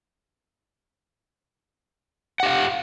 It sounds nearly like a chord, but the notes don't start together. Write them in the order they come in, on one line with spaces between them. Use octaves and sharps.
F#5 G4 F5